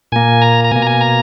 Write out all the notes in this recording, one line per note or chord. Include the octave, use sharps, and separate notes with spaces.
A#2 A#3 G#5
A#5
A#5
B2 A#3 G#5
A#5
G#5
A#5